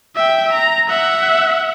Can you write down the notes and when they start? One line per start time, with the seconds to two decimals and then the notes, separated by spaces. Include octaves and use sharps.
0.15 E5 G5
0.53 A#5
0.89 E5 F#5